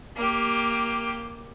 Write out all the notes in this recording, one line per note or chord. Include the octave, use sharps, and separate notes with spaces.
A#3 G4